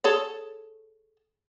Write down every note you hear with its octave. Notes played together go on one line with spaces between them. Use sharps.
G#4 A4 C#5